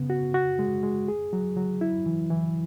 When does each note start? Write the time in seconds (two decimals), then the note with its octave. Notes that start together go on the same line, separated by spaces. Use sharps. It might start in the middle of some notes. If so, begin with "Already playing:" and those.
Already playing: C#3 B3
0.10 F#4
0.34 F#4
0.59 G#3
0.83 G#3
1.08 G#4
1.33 F#3
1.56 F#3
1.81 E4
2.06 E3
2.30 E3